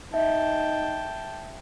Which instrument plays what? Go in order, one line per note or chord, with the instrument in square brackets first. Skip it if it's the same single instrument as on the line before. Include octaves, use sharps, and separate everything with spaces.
[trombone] D#4 [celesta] E5 [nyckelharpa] G5 A5